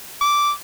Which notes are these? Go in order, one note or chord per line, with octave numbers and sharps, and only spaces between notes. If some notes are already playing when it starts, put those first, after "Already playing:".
D6